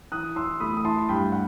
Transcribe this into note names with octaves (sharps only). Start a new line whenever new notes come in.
E3 D#6 F#6
E3 C6 E6
A3 B5 D#6
D#6
E4 A5 C6
G2 G5 B5
F#5